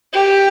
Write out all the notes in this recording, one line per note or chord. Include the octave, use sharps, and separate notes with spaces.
G4